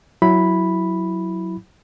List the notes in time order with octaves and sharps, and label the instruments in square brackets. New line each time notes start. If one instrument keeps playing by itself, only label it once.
[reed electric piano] F#3 E4 B5